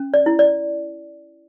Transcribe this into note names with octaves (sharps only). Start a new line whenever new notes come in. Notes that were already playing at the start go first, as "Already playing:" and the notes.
Already playing: C#4
D5
E4
D5